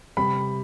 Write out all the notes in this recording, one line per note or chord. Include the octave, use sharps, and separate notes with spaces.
C3 G3 B5